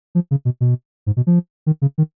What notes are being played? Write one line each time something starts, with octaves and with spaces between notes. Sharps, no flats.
F3
C#3
B2
B2
G#2
B2
F3
D#3
C#3
D#3